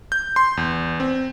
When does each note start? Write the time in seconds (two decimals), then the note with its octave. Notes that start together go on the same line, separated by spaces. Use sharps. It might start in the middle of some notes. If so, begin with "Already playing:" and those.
0.12 G6
0.36 C6
0.57 E2
1.00 C4